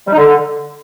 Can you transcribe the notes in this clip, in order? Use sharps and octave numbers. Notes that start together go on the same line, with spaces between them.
G3
D#4
D3